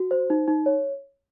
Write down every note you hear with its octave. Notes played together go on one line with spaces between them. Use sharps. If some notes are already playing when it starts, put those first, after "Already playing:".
Already playing: F#4
C5
D#4
D#4
C#5